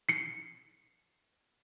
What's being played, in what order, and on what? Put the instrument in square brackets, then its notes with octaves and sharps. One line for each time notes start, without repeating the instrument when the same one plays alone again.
[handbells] C7 C#7